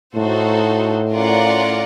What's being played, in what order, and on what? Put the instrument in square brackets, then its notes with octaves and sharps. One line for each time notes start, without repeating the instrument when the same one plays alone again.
[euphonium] A2 [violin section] D#4 F#4 A4 C5
[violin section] C#4 F4 A#4 D5 F#5